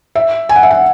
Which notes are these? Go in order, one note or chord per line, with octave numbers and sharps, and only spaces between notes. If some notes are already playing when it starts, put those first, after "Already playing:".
E5
G#5
F#5
E5
F#5